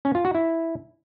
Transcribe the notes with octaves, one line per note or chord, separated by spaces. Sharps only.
C#4
F4
F#4
E4